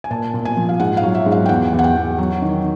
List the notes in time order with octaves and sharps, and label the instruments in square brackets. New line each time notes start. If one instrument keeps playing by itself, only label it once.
[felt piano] G#5
A#2 A5
A#2
G#5
F3
F5
G#2 F#5
F5
F#3
E5
G#2
F5
G5
E2 F#5
E2
F#5
G5
E2
F#3
D#3